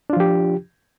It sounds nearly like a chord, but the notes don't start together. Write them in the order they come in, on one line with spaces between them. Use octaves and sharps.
D4 F4 F3 G4